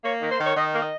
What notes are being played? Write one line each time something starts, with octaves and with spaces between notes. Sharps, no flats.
A#3 C#5
D#3
C5
D#3
C#5
D#3 D#5
A#3
D#5